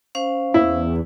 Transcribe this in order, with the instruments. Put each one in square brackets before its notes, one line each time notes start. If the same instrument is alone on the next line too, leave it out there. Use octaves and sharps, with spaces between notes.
[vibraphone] C#4 C5 F5
[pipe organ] E2 [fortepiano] E4